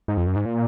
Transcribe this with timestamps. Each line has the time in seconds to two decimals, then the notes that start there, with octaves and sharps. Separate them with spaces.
0.08 G#2
0.17 F2
0.26 F#2
0.36 G#2
0.45 A#2